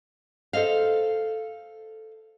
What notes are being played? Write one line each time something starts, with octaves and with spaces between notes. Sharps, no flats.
A4 C5 D#5 F5